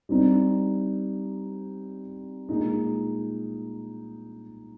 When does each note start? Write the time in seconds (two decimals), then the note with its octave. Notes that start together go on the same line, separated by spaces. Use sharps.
0.09 G3 C4 D#4
2.49 A#2 G#3 D#4